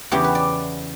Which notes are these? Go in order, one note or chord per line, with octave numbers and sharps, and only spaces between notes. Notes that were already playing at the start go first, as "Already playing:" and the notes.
E2 C#3 E3 B3 G4
B4
D5